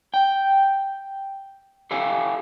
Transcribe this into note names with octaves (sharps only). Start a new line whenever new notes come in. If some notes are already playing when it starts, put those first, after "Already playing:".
G5
E4 G4 A4 F5 G#5